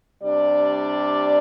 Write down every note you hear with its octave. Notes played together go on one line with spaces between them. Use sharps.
C3 G3 D4 D5